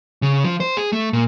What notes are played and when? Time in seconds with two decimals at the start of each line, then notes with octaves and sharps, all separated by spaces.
0.22 C#3
0.44 F3
0.60 C5
0.77 G#4
0.92 A3
1.13 A#2